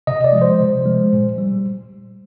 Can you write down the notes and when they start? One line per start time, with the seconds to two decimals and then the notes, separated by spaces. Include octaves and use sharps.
0.07 C3 D#5
0.24 D5
0.33 F3 G#3
0.42 C5
0.60 C3
0.85 F3 G#3
1.13 A#2
1.38 G3